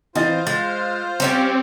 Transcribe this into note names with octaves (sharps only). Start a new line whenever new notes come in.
E3 C4 F4 C5 D#5 A6
G#3 A6
G3 C4 C#4 G4